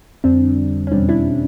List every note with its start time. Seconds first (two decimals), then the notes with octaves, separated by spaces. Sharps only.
0.24 F2 D3 G3 C4 D4
0.87 C#4
0.91 E2 B2 G3 C4 D4
1.09 D4 E4